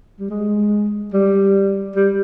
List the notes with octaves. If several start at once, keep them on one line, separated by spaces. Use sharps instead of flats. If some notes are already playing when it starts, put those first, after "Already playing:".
G3
G#3
G3
G3